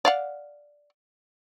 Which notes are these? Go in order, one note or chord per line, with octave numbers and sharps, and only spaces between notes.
D5 F5 F#5